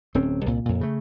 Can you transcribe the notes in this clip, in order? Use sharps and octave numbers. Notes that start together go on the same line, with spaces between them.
D1 C4 C#4
C2 A#2
F2 A#2
C#3 A3